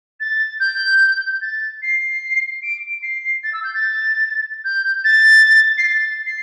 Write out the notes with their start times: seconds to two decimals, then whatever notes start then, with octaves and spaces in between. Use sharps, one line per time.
0.20 A6
0.60 G6
1.41 A6
1.82 C7
2.63 D7
2.87 D7
3.02 C7
3.43 A6
3.53 E6
3.64 G6
3.74 A6
4.65 G6
5.04 A6
5.78 C7
5.85 A6
6.26 C7